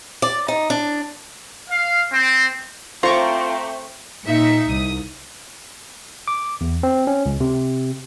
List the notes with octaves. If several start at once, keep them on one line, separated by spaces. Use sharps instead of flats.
D5
D#4
D4
F5
C4
A3 C4 F4 C5 A#5 C#6 D6
A#2 D#4 E5 C#7
C2 D#6
D6
E2
C4
C#4
C#2
C3